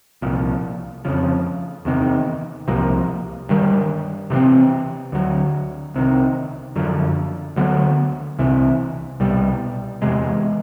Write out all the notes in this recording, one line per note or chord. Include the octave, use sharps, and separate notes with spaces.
C2 A#2 F3
F2 C#3 F3
E2 C3 D#3
C2 C3 F3 A#3
G2 D#3 G3
C3 E3 A3 C4
D2 D3 F#3
C2 C3 D#3
F#2 D3 F3
D2 D3 F#3 B3
C2 C3 E3
C2 B2 G3
E2 C3 E3 G#3